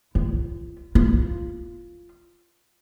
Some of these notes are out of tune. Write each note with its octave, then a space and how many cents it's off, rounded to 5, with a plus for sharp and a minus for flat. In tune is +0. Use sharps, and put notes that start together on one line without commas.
F4 -35
F4 -10